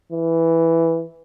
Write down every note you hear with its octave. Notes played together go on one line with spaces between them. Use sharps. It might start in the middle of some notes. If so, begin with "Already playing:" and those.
E3